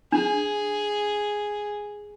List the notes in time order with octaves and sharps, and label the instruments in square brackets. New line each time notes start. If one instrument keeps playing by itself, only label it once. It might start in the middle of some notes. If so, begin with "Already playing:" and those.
[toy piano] D4 [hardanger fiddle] G#4